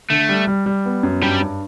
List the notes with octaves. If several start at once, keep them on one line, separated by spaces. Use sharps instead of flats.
D3 A3
G3
G3
G3
B3
F#2
G2 G3
G2